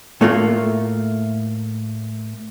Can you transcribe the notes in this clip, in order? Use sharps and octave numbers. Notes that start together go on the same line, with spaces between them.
A2 A3 A#3 F4